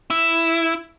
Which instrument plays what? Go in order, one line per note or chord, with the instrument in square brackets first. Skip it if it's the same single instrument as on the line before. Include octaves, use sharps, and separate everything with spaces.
[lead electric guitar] E4